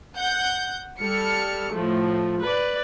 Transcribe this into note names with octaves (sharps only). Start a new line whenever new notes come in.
F#5 G6
G3 A4 F6 C#7
A2 F3 A3
B4 D5